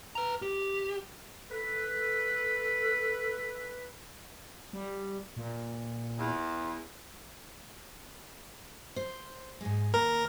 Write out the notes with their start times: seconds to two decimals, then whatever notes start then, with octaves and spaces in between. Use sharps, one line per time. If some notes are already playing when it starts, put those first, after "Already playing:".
0.15 B4 A#5
0.42 G4
1.50 A4 B4
4.73 G3
5.36 A#2
6.18 E2
8.96 C5
9.61 G#2 G#3
9.94 D#2 A#3 A#4